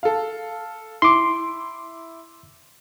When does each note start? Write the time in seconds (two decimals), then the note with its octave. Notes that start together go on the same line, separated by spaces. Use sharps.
0.03 A4 F5
1.02 E4 C6 D6